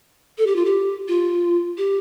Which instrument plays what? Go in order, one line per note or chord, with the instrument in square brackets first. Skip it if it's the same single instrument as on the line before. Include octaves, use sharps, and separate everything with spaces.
[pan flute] A4
G4
F4
G4
F4
G4